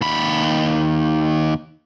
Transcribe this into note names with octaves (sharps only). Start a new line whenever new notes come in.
D#2 B5